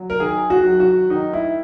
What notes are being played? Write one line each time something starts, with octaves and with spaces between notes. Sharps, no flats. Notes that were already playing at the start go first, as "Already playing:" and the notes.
Already playing: F#3
A#4
D#3 G#4
F#4
F#3
F#4
D#3 D#4
E4